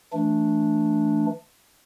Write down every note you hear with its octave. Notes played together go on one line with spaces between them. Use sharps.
E3 A3 D4